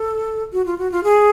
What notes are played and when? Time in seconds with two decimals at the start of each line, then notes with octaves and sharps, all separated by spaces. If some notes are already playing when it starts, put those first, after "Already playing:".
Already playing: A4
0.53 F#4
0.66 F4
0.78 F#4
0.92 F4
1.03 G#4